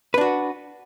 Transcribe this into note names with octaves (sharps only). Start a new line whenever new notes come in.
D4 F#4 B4